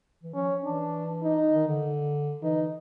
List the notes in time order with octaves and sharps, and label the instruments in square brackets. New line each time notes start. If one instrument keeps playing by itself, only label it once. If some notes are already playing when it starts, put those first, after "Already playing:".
[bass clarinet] E3
[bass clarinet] F3 [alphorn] C#4
[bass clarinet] E3 [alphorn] D4
[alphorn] D#4
[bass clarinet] D#3
D3
[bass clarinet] E3 [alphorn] D#4